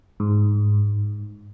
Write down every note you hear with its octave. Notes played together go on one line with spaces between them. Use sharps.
G#2